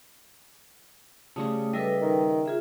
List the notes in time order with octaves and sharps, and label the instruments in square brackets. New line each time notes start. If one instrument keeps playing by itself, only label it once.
[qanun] C#3 G3 C#6 [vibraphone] A3 D#6
[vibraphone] G3 A4 B4 [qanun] D#5 E5
[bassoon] D#3
[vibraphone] F4 G#4 E5